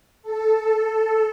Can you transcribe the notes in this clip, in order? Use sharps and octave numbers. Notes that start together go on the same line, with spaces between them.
A4